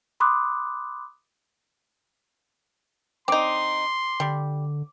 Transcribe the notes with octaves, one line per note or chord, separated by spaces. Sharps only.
B5 C6 D6 D#6 F#6
C4 D#4 C6 D6
D3 G3